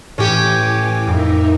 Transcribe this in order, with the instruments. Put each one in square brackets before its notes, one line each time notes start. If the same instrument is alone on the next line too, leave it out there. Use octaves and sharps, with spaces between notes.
[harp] A2 [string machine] E3 G#5 D6 [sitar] C#4 G4
[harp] F2 D6 [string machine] D#4 A#4 E5